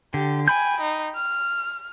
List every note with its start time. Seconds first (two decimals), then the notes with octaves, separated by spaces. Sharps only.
0.14 D3 G4
0.48 G5 G#5 B5 G6
0.81 D#4
1.15 F6